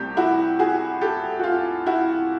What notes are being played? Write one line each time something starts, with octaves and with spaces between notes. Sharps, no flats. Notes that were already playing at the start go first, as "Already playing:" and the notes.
Already playing: C2 C3 A3 C4 G4
E4 F#4
F#4 G#4
G4 A4
F#4
F4
E4 F#4